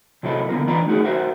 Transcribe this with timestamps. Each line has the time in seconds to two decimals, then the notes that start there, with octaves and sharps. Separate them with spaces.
0.23 C3 F#3 A#3 E4 A4 D#5
0.49 D3 A#3 B3 F4 A#4
0.67 E3 D4 F4 B4 D5 A#5
0.87 A3 D#4 F#4 G#4 A#4
1.04 F#4 A#4 C5 E5